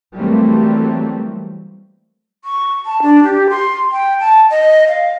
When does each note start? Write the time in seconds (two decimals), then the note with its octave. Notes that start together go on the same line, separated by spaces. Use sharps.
0.15 E3 F#3 G3 A3 A#3 C4
2.45 C#6
2.86 A5
3.02 D4
3.23 G4
3.50 C6
3.92 G5
4.20 A5
4.51 D#5
4.88 F5